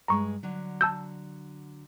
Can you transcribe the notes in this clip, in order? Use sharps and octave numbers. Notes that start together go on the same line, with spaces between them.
G2 G#3 A#5 C#6
D3 F#3
A5 E6 G6